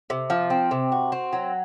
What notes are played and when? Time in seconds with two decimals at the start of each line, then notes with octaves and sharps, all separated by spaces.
0.10 C3
0.30 F3
0.50 C4
0.71 C3
0.92 F#4
1.12 C4
1.33 F#3